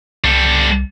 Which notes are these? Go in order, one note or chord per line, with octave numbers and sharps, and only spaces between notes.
C2 G3 A4